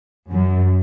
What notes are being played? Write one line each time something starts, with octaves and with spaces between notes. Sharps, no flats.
F#2